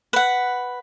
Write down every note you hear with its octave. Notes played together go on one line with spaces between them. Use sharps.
B4 F#5